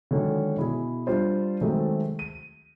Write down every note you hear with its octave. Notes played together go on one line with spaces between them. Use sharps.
D3 D#3 F#3 G#3 C#4
B2 E4 G#4
G3 D4 F4 C5
C3 D#3 F#3 G#3 A3 C4
D#7